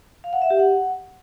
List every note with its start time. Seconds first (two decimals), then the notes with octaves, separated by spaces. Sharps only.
0.24 F5
0.33 F#5
0.42 E5
0.50 G4
0.59 F#5